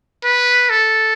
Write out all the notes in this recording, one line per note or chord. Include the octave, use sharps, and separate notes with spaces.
B4
A4